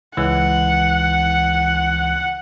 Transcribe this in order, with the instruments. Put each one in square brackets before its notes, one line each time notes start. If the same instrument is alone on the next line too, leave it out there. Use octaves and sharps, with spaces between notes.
[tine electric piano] C#2 E3 [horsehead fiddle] F#5